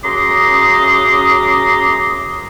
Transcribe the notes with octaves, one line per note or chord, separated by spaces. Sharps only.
F#2 C#3 A#5 C6 D6 D#6